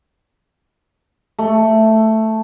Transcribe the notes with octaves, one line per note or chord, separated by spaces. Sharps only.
A3